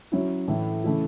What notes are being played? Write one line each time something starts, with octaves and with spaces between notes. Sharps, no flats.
F#3 C#4 E4
A2 E3 A3 E4
C#3 E3 A3 E4